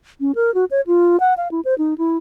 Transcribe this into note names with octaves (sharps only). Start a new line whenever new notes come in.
C#4
A#4
F#4
C#5
F4
F#5
F5
E4
C5
D#4
E4